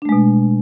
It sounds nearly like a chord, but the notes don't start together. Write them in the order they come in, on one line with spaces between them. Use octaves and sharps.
D4 A3 G#3 B2